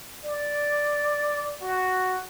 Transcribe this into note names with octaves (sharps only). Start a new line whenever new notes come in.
D5
F#4